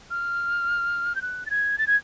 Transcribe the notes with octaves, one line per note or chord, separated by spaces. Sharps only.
F6
G6
F#6
A6
G#6
A6
G#6